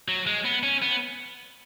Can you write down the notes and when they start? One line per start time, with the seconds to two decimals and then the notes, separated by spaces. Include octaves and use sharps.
0.08 F#3
0.27 G#3
0.45 B3
0.63 C#4
0.82 B3